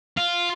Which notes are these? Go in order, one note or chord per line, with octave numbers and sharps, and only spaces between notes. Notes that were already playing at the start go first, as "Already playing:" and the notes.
F4